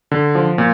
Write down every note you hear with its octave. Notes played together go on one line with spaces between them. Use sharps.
D3
F3
A#2